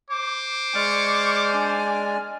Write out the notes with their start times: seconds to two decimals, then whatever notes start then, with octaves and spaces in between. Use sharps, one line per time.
0.10 C5 D6
0.75 G#3 D5 C#6 F6 G#6
1.49 D4 G#5